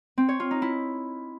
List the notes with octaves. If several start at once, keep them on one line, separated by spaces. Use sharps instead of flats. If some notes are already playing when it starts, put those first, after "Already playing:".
C4
C#5
F4
D#4
E4